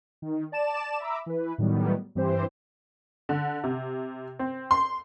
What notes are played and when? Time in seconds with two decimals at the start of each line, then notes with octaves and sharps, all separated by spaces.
0.22 D#3
0.52 D5 A5 E7
1.00 E5 A#5 B5 D6 E6
1.26 E3 B4
1.58 A2 D#3 F#3 G3 B3
2.15 G2 E3 C4 G4 C5
3.29 D3
3.64 C3
4.39 C4
4.71 C6